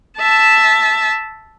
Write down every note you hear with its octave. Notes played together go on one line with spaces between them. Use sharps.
E5 A5